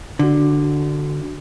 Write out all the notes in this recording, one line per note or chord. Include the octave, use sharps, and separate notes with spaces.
D3 D4 F#4